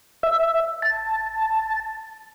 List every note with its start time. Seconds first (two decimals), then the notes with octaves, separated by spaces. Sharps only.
0.23 E5
0.82 A5